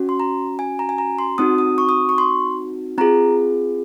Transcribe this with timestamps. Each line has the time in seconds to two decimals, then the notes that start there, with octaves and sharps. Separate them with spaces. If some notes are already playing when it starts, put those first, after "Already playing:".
Already playing: C#4 F#4
0.09 C6
0.20 A#5
0.59 G#5
0.79 A#5
0.89 G#5
0.98 A#5
1.19 C6
1.38 C4 D#4 F#4 D#6
1.58 D#6
1.78 C#6
1.89 D#6
2.09 C#6
2.18 C6
2.98 C4 F4 G#4 A#5